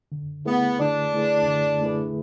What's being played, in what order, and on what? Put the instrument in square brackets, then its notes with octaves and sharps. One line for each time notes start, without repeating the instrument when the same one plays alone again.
[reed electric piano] D3
[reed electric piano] A3 E4 G#4 B4 [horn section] B3
[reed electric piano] D3 [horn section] D4
[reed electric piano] A3 E4 G#4 B4
D3
A3 E4 G#4 B4